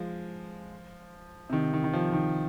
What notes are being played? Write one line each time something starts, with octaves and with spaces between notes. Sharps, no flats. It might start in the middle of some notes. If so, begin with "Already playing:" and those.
Already playing: F3 G#3
C3
D#3
D#3
D#3
F3
D#3